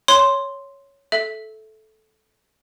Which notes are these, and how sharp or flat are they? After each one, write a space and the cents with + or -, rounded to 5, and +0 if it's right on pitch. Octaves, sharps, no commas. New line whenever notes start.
C#5 +0 C6 +0
A4 -15 E5 +0